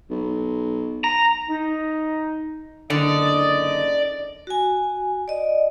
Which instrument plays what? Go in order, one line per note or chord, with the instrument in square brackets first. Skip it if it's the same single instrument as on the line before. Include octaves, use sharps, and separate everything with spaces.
[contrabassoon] B1
[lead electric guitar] A#5
[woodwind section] D#4
[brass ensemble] F#1 D#4 D#5 [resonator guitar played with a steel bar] D3 [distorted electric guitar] D5
[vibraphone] F#4 G#5
D5 D#5